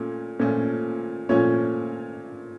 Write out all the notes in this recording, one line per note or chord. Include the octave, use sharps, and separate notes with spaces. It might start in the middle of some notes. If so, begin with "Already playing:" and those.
Already playing: A#2 A3 C#4
A#2 F3 A3 C#4
A#2 F3 A3 C#4 C#5